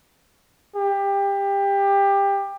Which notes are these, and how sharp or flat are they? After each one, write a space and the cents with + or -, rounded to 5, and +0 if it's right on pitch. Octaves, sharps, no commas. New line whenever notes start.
G4 +20